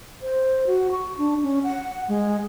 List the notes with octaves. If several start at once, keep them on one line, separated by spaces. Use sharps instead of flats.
C5
F#4
C#6
D4
C#4
F#5
G#3